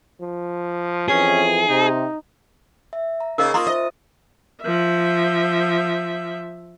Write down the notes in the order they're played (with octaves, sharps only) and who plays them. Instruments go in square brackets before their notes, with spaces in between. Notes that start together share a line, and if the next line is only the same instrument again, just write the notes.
[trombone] F3
[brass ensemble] F2 E3 [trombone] C#4 [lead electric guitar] G#4
[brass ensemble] C3 [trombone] D#4
[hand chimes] E5
A#5
[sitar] C#3 A#3 [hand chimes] D#4 [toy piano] A#4 C5 D#5
[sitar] A#3 [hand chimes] F4 D#6 A6 [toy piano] A#5 C6 C#6
[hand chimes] C5 E5 A6 [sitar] D#5
[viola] F3 E5